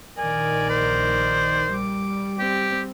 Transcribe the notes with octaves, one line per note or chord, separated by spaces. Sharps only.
A#1 D#3 A#4 D5 G#5
C5
G3 D6
C4 G4